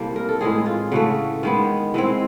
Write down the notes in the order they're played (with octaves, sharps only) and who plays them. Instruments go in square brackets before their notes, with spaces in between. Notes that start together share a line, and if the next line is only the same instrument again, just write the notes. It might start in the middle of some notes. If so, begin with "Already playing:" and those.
Already playing: [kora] C3 E3 G3 A#3 A4
A#4
A4
A2 E3 G#3 C4 G#4
F4
C#3 E3 A3 F#4
D#3 G#3 B3
E3 G#3 C4